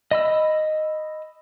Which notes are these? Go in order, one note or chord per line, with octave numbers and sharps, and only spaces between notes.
D#5 B5 E6